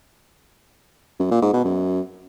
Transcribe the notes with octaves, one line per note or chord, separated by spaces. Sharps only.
F#2
A#2
G#2
B2
F#2